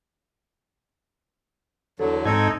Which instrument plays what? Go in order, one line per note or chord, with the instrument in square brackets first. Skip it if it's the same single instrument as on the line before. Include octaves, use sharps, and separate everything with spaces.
[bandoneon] E2 D3 F#3 [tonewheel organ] A4
[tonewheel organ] G#2 D#5 G#6 [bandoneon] C4 D#4 A4